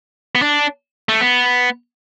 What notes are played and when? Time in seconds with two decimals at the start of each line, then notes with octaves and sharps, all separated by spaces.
0.35 B3
0.42 D4
1.09 A3
1.21 B3